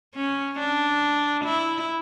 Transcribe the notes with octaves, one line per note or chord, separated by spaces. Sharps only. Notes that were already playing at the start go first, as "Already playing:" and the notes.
C#4
D4
E4